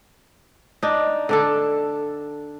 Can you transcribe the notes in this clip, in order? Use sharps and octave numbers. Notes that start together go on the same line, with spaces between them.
D4 D#4
D3 D4 A4